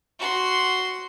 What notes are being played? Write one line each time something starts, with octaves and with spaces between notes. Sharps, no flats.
F#4 C6